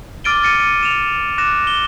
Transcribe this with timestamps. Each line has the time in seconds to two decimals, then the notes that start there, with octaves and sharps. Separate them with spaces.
0.24 D6 F6 A6 D7 D#7 G7
0.43 A6 C#7 D#7
0.60 D#7
0.83 E7 F7
1.38 D6 F#6 A#6 E7
1.67 G7